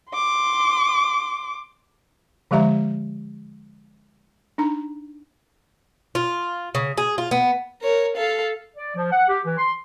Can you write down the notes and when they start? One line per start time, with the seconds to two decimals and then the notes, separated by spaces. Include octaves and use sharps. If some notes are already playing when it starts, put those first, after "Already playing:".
0.11 C6 D6
2.51 D3 F3 G#3 G4 E5 A#5
4.58 D4 D#4 A#5
6.15 F4
6.75 C#3
6.97 G#4
7.18 F4
7.31 B3
7.82 A#4 C#5
8.17 A4 F5
8.76 D5
8.96 F3
9.12 F#5
9.28 G4
9.45 E3
9.57 C6